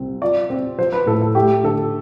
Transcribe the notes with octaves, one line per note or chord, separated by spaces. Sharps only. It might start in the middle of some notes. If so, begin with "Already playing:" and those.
Already playing: C2 C4
F4 D5
C4
F3 C5
B4
A2 A4
A4
A3 G4
D3 A4